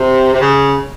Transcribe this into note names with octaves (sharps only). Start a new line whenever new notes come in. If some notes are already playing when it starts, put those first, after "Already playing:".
Already playing: C3
C3
C#3